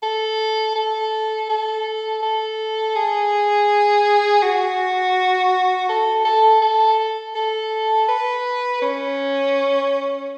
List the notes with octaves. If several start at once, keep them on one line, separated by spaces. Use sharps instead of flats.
A4
A4
A4
A4
G#4
F#4
A4
A4
A4
A4
B4
C#4